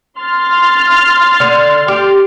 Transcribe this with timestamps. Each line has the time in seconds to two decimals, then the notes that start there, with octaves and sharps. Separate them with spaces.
0.20 C6 F6 A6
1.40 D3
1.88 G4